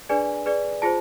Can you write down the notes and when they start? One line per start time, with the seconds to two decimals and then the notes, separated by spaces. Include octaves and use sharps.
0.09 D4 G#4 B4 D5 G#5
0.46 G#4 B4 D5
0.82 F4 G#4 C5 A5